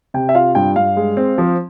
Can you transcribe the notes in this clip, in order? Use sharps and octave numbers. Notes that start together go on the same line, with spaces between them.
C3 G5
E5
F4 F5
G2 G5
G2 F5
G#3
C4
F3